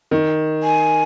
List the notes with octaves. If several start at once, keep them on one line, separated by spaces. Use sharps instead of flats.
D#3
G#5